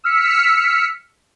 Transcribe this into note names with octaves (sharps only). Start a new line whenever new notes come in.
E6 F6 B6 C#7